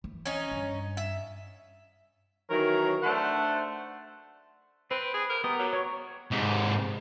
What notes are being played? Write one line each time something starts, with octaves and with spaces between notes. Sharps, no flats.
E3
C#4 D#4
G2
E5
D#3 E3 F#3 A#4 C#5
A3 D4 C5 F#5
C4 B4
G#4
A#4
B3 G4 A#4 D#5
F#3
C#5 A#5 C#6
G#2 C3